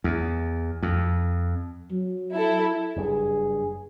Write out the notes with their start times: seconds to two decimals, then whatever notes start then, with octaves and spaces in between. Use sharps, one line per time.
0.04 E2
0.83 F2
1.91 F#3
2.34 E4 A4
2.97 F#1 G2 G#4